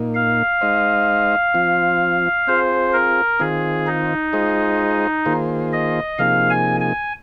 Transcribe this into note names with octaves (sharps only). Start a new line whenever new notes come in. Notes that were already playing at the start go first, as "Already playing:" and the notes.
Already playing: A#2 A#3 D#4
F5
G#3 D#4 C5 D#5
F3 C4 F4
C4 F4 G#4 C5
A#4
D#3 C4 F4 G#4
D#4
G#3 F4 G#4 C5 D#5
D#3 A#3 F4 G#4 C5
D#5
C3 F3 A#3 D#4 G#4 F5
G#5
G#5